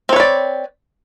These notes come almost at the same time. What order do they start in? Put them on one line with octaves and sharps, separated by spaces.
C4 C#5 B4 D5